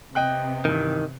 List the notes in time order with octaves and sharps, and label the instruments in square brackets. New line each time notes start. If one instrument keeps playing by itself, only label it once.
[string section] C3 B3 [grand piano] D#5 G5 F#6
[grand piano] G2 E3 [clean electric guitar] D#3